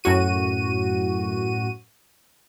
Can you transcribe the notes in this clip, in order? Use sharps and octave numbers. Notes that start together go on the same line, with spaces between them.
F#2 A2 F#4 D#7